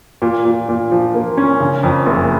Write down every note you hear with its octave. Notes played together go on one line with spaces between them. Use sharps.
A#2
A#2
A#2
F3
A#3
C#4
C#3
F2
F#1